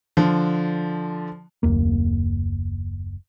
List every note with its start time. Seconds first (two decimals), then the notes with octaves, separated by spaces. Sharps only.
0.17 D3 F3
1.63 F#1 D#2 A#3